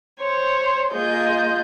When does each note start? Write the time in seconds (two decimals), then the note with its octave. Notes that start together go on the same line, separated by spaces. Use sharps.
0.20 C5 C#5
0.91 A#3 F4 G#4 D#5 G6